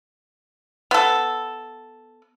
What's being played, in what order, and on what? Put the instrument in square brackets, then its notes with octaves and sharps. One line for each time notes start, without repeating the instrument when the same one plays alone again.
[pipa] B3 A4